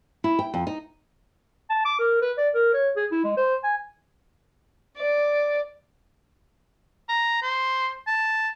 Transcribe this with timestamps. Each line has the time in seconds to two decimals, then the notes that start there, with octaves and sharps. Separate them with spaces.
0.24 E4
0.39 G5
0.54 F2
0.67 D#4
1.70 A5
1.85 D6
1.99 A#4
2.21 B4
2.38 D5
2.54 A#4
2.73 C#5
2.96 G#4
3.12 E4
3.24 G#3
3.37 C5
3.63 G#5
4.98 D5
7.09 A#5
7.42 C5
8.07 A5